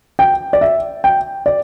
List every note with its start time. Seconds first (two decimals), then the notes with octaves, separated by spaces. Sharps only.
0.19 G5
0.53 D5
0.61 E5
1.04 G5
1.46 D5